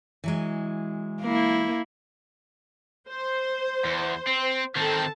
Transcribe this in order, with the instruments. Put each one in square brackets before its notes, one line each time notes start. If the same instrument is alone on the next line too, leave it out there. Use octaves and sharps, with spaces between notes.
[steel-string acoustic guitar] E3 F#3 G#3
[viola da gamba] A#3 E4
[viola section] C5
[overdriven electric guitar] E2
C4
[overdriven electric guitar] D#3 C4 [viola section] A4 A5